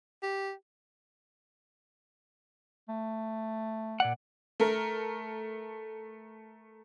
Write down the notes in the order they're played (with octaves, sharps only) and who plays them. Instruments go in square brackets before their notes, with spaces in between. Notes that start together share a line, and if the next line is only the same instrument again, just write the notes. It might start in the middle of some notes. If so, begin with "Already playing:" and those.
[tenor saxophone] G4
[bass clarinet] A3
[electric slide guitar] A#2 D5 F#5
[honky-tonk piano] A3 A#4